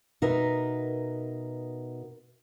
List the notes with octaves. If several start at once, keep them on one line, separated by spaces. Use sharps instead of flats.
B2 D#4 A#4 B4 E5